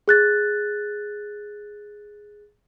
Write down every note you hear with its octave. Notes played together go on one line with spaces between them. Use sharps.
G#4 F#6 A6